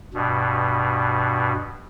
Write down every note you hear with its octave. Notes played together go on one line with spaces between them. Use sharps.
G2 B2